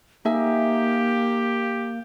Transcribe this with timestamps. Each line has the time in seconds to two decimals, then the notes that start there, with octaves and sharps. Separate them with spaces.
0.25 A#3 D#4 G4 E5 G#5